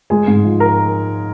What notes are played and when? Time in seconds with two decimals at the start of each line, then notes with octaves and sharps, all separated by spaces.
0.10 G#3 G#4 G#5
0.27 G#2
0.44 F3
0.60 A#4 A#5